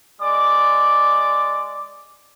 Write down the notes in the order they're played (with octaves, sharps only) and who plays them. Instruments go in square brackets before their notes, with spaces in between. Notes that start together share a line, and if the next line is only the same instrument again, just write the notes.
[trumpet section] G#3 D5 D6